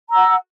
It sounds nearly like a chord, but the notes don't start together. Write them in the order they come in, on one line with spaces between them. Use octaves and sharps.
A#5 E6 F#5